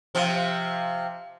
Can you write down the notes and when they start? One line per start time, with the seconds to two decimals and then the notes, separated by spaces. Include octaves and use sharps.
0.15 C3 F3